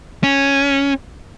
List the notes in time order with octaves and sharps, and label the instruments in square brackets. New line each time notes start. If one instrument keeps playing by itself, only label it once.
[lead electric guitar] C#4